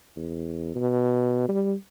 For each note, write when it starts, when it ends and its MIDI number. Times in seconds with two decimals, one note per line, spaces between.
0.16 0.71 40
0.75 1.46 47
1.48 1.74 55